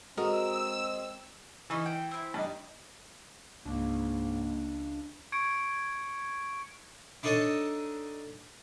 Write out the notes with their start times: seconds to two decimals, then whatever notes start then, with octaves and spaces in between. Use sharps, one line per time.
0.17 G#3 C4 F#4 A#4 D#5 E6
1.70 E3 C#4 D#4
1.86 G5
2.11 C4 E4
2.34 G2 D#4
3.66 C#2 G#2 A#3 D4
5.32 C#6 G#6 C#7 D7
7.23 D4 D#4 A4 C#5 D#5 A5